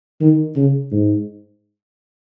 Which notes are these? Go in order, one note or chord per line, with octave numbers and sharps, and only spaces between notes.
D#3
C#3
G#2